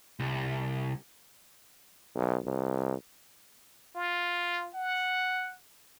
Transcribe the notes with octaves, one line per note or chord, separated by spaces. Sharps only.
C2
B1
C2
F4
F#5